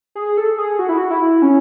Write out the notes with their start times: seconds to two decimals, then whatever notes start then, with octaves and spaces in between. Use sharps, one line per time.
0.15 G#4
0.37 A4
0.58 G#4
0.79 F#4
0.89 E4
0.98 F#4
1.10 E4
1.42 C#4